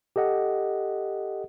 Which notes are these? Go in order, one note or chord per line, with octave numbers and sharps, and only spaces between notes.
G4 A4 D#5 F#5